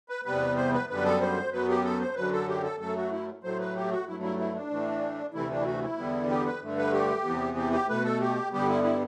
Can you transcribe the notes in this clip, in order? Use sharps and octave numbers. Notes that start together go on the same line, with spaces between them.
B4
E2 C3 G3 B3 B4
C5
B4
F#2 D3 G3 B3 B4
A4
C5
F#2 F#3 B3 B4
G4
A4
C5
F#2 D3 F#3 B4
A4
G4
A4
F#2 F#3 A3 A4
F#4
E4
A2 F#3 A3 C5
B4
G4
F#4
G2 F#3 A3 E4
E4
E4
D4
A2 E3 A3
D2 C3 E3 A3 E4
D4
E4
F#4
E4
E2 D3 G3 B3
G4
B4
G2 D3 A3
B4
G4
E2 C3 E3 B3
G4
G4
B2 A3 B4
A4
G4
G2 D3 G3 B3 G4
E4
E4